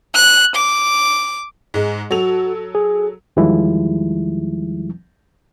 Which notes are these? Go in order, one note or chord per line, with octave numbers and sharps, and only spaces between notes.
F#6
D6
G#2 G#3
F#3 F#4 A4 F7
G#4
E2 D#3 F3 G3 G#3 E4